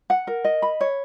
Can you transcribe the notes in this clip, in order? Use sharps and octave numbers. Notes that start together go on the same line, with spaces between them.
F#5
A#4
D#5
B5
C#5